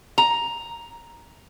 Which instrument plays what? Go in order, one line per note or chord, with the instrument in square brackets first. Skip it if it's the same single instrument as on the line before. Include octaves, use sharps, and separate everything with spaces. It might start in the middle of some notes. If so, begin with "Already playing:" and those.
[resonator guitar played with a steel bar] A#5